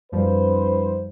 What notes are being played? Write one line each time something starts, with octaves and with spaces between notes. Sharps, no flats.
F#2 F3 G3 D#4 B4 C5